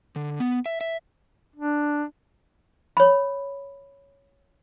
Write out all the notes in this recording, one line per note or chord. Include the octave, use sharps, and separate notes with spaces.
D3
B3
E5
E5
D4
C#5 B5